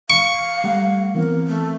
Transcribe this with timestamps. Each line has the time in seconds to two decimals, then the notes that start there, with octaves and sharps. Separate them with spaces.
0.10 F5 C#6
0.64 G3 A3 F#5
1.15 E3 B3 C4 A#4
1.47 A3